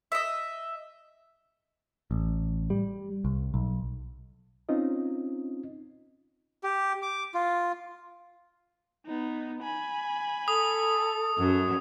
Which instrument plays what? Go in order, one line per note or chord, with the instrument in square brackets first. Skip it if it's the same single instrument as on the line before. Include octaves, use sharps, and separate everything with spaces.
[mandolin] D#5 E5
[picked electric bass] A1
G3
C2
B1
[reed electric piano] C4 C#4 D#4 F4 D#5
[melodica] G4
D6
F4
[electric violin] B3 D#4
G#5 B5
[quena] A4 [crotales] D#6
[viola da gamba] F#2